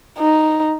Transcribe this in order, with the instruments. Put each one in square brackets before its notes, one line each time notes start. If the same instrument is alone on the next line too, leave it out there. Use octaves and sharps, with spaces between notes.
[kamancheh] D#4